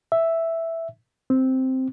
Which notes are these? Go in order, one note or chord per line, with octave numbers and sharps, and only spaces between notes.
E5
C4